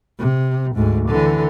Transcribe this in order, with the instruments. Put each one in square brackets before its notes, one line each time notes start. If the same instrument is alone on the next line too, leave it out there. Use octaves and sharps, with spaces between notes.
[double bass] C3
D2 G#2
D3 E3